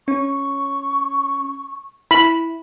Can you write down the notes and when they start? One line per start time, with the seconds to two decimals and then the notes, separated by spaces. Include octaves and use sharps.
0.08 C#4 C#6
2.11 E4 B5